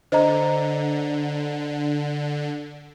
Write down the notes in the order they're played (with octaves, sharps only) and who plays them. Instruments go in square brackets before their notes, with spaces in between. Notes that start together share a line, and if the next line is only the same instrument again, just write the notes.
[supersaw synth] D3 [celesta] C5 D#5 A#5